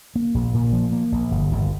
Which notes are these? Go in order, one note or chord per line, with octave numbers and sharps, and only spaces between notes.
A#3
A#1
A#2
F3
A#3
A#1
G1
G1